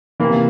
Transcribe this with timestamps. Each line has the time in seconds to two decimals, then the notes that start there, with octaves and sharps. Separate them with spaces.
0.20 C3 E3 A#3